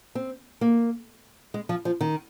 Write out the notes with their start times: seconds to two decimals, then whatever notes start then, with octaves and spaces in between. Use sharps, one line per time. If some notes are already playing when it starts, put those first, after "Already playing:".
0.15 C4
0.61 A#3
1.54 G#3
1.69 F3
1.85 F3
2.01 D#3